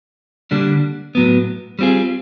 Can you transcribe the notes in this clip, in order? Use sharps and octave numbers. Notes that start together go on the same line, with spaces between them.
D3 G3 A#3 D4
A2 F#3 B3
G3 C4 F4 G#4